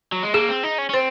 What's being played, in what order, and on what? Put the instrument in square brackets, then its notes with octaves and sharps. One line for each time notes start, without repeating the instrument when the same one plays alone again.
[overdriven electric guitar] F#3
G#3
[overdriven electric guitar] A#3 [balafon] G#4
[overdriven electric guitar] C4
D#4
C#4
C#4
[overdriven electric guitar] C4 [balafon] C5